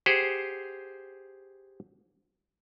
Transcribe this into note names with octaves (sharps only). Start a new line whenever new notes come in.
G4 G#4 C5 F#5